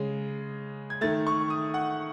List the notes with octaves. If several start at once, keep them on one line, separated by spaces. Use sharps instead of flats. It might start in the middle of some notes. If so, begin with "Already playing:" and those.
Already playing: C#3 G#3
G#6
D#3 A3 A6
C#6
D#6
F#5